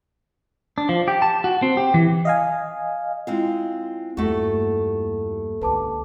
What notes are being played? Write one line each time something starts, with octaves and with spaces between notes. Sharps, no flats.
D4
F3
G4
A5
F#4
C4
G4
E3
D#5 F5 G#5
G#3 C4 E4 F4 F5
E2 G2 A3 A#3 F#4 G4 A4
C#2 D3 B4 A5 D6